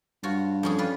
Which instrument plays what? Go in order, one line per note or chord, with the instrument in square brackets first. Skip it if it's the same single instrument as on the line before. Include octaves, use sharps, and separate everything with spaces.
[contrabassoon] G2 [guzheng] F4 F#4 C#5
[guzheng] F2 C#4 G#4
G3 F4 B4